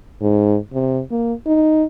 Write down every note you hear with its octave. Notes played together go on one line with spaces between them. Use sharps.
G#2
C3
A#3
D#4